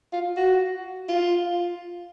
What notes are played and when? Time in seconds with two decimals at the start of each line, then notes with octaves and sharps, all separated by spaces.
0.13 F4
0.37 F#4
1.09 F4